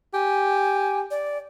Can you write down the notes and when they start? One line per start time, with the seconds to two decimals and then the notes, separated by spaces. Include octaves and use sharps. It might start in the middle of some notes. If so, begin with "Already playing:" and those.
0.14 G4 G#5
1.11 D5